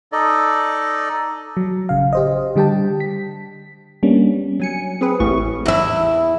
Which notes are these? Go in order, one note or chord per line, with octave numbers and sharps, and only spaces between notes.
D#4 A4 D5 D#5
F#3
A1 C#3 F5
G4 C5 D#5
D3 G3 G4 G5 A5
B6
G3 A#3 B3 C#4 D4
F#3 G#5 C#7
C4 G#4 B4
A1 E3 A3 C#6
E2 E4